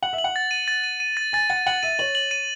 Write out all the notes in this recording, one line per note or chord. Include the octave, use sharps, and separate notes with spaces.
F#5 F#7
E5
F#7
F#5
A6
D#7
A6
D#7
D#7
A6
G#5 A6
F#5 A6
F#5 F#7
E5 D#7
C#5 F#7
F#7
D#7